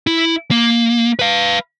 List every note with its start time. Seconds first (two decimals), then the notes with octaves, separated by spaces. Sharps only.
0.07 E4
0.51 A#3
1.19 B4 F5